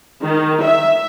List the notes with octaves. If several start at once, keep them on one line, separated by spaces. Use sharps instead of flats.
D#3
E5